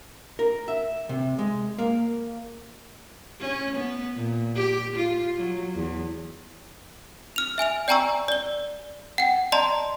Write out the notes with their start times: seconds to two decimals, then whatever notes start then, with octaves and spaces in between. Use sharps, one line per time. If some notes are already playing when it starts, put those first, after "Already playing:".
0.39 A#4
0.68 E5
1.09 C3
1.39 G#3
1.79 A#3
3.41 C#4
3.77 B3
4.16 A#2
4.56 G4
4.97 F4
5.37 F#3
5.76 E2
7.36 F6 F7
7.58 E5 G#5 F6 F7
7.88 D5 G5 G#5 A#5 C#6 E6
8.28 D5 G7
9.18 F#5 G5
9.52 D5 D#5 A5 A#5 C6